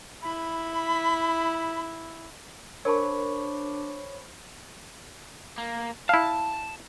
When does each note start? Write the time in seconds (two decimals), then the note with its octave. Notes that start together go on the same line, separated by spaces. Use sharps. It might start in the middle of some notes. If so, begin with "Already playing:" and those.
0.23 E4 B5
2.85 D4 A#4 C5 C#5 G#5 A5 B5 C#6
5.58 A#3
6.09 E4 F5 A5